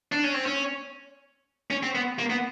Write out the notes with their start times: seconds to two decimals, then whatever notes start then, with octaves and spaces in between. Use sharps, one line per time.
0.12 D4
0.24 C#4
0.34 C4
0.46 C#4
1.71 C#4
1.83 C4
1.95 B3
2.19 A#3
2.30 B3